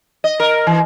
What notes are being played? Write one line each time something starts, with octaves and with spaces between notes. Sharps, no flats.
D#5
A#4
E3